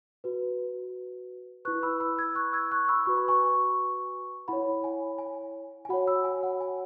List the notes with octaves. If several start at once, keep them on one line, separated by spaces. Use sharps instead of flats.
F#4 B4
E4 B4 C#6 F#6
B5 E6
B5 E6
E6 G#6
C#6 F#6
E6 G#6
C#6 F#6
C#6
B5 E6
F#4 B4 C#6
B5
G#5 C#6
E4 C#5 F#5 B5
G#5
G#5
G#5
F#4 C#5 F#5 B5
B5 E6
G#5
F#5
G#5